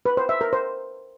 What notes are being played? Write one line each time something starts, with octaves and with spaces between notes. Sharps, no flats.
B4
C5
E5
A#4
C5